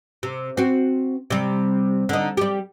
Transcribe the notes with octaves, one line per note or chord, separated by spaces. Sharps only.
C3
C4 F#4
C3 G3
D3 D#4
G3 G4